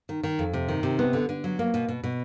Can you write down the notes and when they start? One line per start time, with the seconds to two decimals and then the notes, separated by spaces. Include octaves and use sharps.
0.09 D#3
0.23 D#3
0.39 F2
0.53 C3
0.68 D#3
0.83 C3
0.99 B3
1.13 D3
1.29 D3
1.44 F#3
1.59 A#3
1.74 B2
1.88 B2
2.03 B2